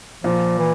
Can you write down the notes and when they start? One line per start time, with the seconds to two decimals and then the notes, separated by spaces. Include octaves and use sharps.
0.24 A#2 F3
0.59 E3